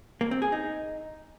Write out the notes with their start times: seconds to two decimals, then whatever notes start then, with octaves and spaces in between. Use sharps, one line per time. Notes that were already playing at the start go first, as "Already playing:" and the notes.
0.21 A#3
0.31 C4
0.42 G#4
0.52 D#4